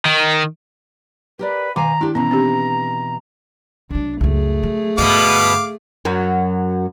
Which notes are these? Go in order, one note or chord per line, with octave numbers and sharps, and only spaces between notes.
D#3
G4 A#4 B4 D5
B2 D#3 F5 G#5 A#5 D6
D4 E4 G4
B2 E3 B3 C#4 A#5
C4 D4 G4
C2 F#3 D4
C#2 F#2 A3 G#4
F#3
G2 B2 D3 B3 F5 D6
F#2 F#3